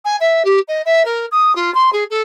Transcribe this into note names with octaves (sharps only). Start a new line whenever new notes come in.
G#5
E5
G4
D#5
E5
A#4
D#6
F4
C6
G#4
A4